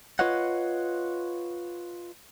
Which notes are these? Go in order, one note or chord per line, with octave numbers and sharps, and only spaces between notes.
F4 B4 C#5 D#5 F#5